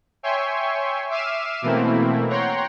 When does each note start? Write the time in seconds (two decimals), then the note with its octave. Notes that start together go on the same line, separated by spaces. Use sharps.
0.23 C#5 E5 G5 G#5 C6 C#6
1.10 E5 D6 F6 C7 D#7 E7
1.62 B2 E3 A3 A#3 C4 E4
2.29 C#5 F#5 G5 A#5 C6